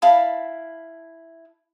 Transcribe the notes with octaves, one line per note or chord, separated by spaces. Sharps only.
E4 F5 A5 B5